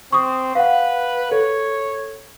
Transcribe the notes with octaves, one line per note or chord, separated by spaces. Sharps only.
C4 C#6 D#6
B4 F5 F#5
A4 C#5